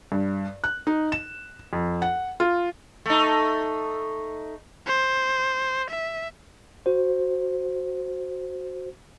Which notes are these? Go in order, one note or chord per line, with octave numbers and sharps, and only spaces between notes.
G2
F#6
D#4
E7
F2
F#5
F4
A3 D#4
C5
E5
F#4 C5